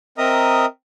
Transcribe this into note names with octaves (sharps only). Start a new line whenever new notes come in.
C4 A#4 D#5 E5 A#5 D#6